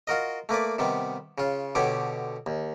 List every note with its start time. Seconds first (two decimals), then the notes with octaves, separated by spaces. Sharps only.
0.07 F4 F#4 A#4 D#5
0.49 A3 A#3 B4 D5
0.78 C3 D#3 G3 B3
1.38 C#3 F4
1.75 B2 D3 B3 G4 C#5
2.46 D#2